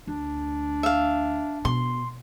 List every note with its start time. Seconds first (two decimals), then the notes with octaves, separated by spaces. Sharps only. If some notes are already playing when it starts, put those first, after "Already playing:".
0.08 D2 D4
0.83 E5 F5
1.65 B2 C6